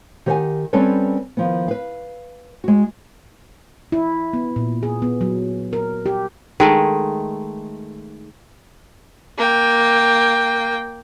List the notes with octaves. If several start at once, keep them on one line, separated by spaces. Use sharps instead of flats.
D#3 G4 C5 E5 F#5 G#5
G3 C4 C#4 A4 B4 C#5
D#3 F3 B3
B4 F5
G#3 F#4
E4
B3
A#2
G#4
B3
F#3
A#4
G4
D#3 G#3 A3
A#3 G5